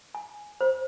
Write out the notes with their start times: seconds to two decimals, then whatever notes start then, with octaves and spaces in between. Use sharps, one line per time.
0.15 G#5
0.61 C5